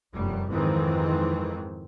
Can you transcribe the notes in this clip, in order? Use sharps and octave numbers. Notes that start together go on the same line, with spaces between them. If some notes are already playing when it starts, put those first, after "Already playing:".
F1 F#2 G3
F2 G#2 D#3 E3 C4